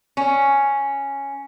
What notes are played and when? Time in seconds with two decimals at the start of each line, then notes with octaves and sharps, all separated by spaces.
0.17 C#4